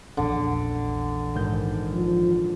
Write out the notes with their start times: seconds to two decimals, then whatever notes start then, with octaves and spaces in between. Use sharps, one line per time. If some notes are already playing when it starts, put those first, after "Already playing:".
0.17 A#1 E2 D3
1.35 G#1 G6
1.93 F3